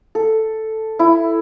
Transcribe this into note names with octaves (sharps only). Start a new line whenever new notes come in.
A4
E4